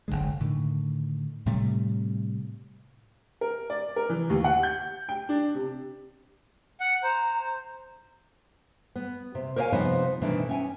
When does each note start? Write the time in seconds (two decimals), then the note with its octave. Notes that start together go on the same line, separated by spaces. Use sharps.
0.08 F1 D2 D3 G#3
0.40 A2 D3 D#3
1.46 A2 C3 G3 A3
3.41 A#4
3.70 D5
3.96 A#4
4.10 E3
4.30 D#2
4.44 F#5
4.63 G6
5.09 G5
5.29 D4
5.55 C3
6.80 F#5
7.03 C5 A#5
8.96 B3
9.35 C3
9.56 A#4 C5 C#5 D#5 F5 G#5
9.72 C3 F3 B3 D#4 C5 D#5
10.21 B2 D#3 E3 A3 D4
10.49 C#4 G5 G#5